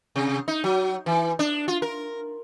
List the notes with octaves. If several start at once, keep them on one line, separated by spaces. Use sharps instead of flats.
C3
D#4
F#3
E3
D4
F4
A#4